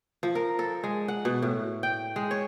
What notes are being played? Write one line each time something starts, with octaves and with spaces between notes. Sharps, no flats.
F3
A#4
A4
G#3
F#5
B2
A2
G5
G#3
C#5